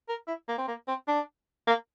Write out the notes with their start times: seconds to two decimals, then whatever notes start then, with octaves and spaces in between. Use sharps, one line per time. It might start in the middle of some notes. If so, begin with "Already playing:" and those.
0.09 A#4
0.28 E4
0.48 A#3
0.58 C4
0.68 A#3
0.88 C4
1.08 D4
1.67 A#3